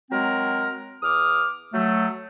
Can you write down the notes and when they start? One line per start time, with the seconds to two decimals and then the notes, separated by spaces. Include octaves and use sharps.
0.11 F#3 G#3 C4 A#4
1.03 E2 D6 D#6 F6
1.73 F#3 A3